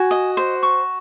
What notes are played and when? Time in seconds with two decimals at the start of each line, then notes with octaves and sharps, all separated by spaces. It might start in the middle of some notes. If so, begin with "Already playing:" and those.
Already playing: F#4 G#5
0.11 D#5
0.37 C5
0.63 C#6